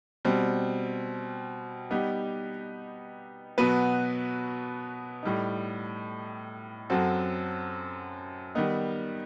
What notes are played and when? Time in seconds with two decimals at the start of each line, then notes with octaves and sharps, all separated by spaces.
0.25 B2 G3 C4
1.90 G3 B3 D#4 G4
3.58 B2 F#3 B3 F#4 B4
5.23 A2 G3 D#4
6.90 F#2 F#3 C4 F#4 A4
8.55 D#3 G3 B3 D#4